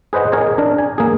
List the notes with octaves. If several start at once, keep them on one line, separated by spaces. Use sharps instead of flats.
G#4 B4 C5 D#5 F#5
G#4 A#4 C#5 D#5
D4 A#4
G#5
A#3 G#4